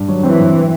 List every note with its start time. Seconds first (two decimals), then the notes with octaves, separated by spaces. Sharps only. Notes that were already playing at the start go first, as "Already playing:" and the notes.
Already playing: G2
0.08 F#3
0.23 E3 C4
0.39 G2